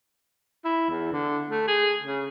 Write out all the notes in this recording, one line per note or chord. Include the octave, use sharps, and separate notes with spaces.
E4
E2
D3
A3
G#4
C#3